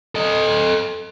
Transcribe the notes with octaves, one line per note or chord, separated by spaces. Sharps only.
A4 D#5